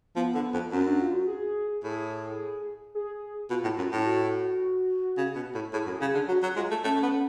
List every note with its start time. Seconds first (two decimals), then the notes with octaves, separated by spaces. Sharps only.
0.16 F3 B3
0.34 D3
0.53 F2
0.72 F#2 C#4
0.86 D4
1.00 F4
1.13 F#4
1.27 G#4
1.84 A2 G#4
2.95 G#4
3.50 B2 F4
3.64 A2
3.78 F#2
3.92 A2
4.05 F#4
5.17 C#3
5.35 B2
5.54 A2
5.73 A2 G#4
5.87 F#2
6.01 C#3
6.14 D3
6.28 F#3 F#4
6.43 F#3
6.56 G#3 F4
6.71 A3
6.84 A3 C#4
6.96 A3
7.03 B3